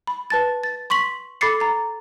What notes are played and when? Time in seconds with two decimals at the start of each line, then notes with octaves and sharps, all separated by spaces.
0.07 B5
0.30 B4 A5 A6
0.64 A6
0.90 C6 C#6 B6 F#7
1.41 A4 B5 D6 A6 C7 C#7
1.60 A#5 A6